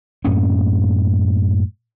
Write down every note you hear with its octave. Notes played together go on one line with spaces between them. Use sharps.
F#2 A2 A#3 C#4